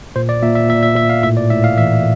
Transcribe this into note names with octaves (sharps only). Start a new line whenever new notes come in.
A#2 C5
D5
A#2 E5
E5
A#2 E5
E5
A#2 E5
F5
A2 E5
D5
A2 E5
F5
E3 E5